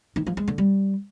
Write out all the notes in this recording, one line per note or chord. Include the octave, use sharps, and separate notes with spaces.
D#3
F3
G#3
D3
G3